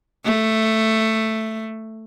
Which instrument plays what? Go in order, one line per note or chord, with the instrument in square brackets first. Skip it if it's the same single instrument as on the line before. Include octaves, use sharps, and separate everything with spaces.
[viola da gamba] A3